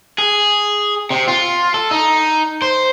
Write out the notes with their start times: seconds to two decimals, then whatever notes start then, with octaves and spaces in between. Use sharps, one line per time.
0.18 G#4
1.10 C3
1.28 F4
1.74 A4
1.91 D#4
2.62 C5